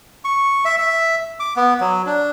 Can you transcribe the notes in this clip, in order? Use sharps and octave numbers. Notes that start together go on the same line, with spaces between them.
C#6
E5
E5
D6
B3
F#3
D4